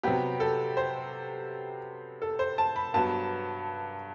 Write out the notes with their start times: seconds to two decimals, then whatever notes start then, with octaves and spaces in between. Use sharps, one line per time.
0.03 C3 F#3 B3 G4
0.40 A4
0.77 C5
2.22 A4
2.39 C5
2.58 A5
2.76 B5
2.94 G2 F#3 B3 A5